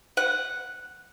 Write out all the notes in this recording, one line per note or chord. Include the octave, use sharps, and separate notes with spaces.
F#5